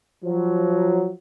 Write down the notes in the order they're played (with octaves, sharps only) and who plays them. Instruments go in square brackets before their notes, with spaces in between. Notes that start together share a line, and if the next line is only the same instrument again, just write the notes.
[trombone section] F3 F#3